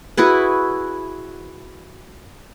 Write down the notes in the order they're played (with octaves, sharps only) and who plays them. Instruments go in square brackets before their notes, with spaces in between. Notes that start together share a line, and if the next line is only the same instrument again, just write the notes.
[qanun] E4 F#4 G#4 B4